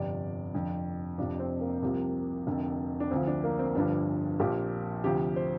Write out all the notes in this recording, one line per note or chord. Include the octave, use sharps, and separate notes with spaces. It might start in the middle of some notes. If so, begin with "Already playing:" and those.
Already playing: G1 F2 C3 D5
F1 F2 D3
F1 F2 C3 F3 D4
C4
A#3
C2 C3 F3
F1 F2 D3
D4
D2 D3 F3 C4
D4
A#3
C4
G1 G2 D3 F3 D4
A#1 A#2 F3 G4
D2 C3 F3 G4
C5